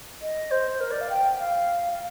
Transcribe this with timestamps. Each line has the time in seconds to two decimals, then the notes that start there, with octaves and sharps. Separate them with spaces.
0.22 D#5
0.51 C5
0.80 A#4
0.91 D5
1.01 F5
1.10 G5
1.31 G5
1.39 F5
1.93 F5